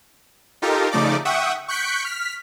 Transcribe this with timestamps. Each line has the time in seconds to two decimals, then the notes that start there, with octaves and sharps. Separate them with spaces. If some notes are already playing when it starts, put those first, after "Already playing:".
0.62 D#4 F4 G4 A4 A#4
0.92 C#3 F3 A3 D#4 D5 D6
1.25 E5 F#5 G5 C#6 D#6
1.68 C#6 F#6 G6 B6 C#7 D7
2.05 F6 B6